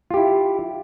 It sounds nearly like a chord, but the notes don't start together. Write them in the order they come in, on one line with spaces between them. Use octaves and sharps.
F4 G4 E4